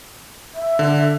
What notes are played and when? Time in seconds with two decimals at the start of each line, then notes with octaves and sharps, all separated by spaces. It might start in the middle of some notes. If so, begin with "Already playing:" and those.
0.55 E5
0.79 D3